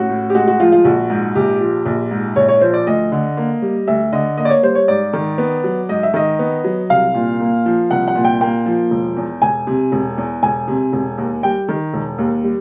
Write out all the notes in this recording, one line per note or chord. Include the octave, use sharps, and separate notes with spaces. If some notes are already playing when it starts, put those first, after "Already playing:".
Already playing: A1 F#4
A2
G4
G#3 F#4
F#4
F3 F4
F4
A#1 F#4
G#2
A#1 G4
F3
A#1
G#2
A#1 C#5
C#5
F3 C5
D5
D2 D#5
D3
A#3
G3
D2 E5
D3 D#5
A#3 D#5
D5
C#5
G3 C5
C#5
G#2 D5
D#3
B3
F#3
G#2 D#5
E5
D#3 D#5
B3
F#3
C2 F5
A#2
A#3
F3
C2 F#5
F#5
A#2
G5
A#3 G5
F3
E1
E2
E1 G#5
C3
E1
E2
E1 G#5
C3
E1
D#2
G3 G5
D#3
E1
D#2
G3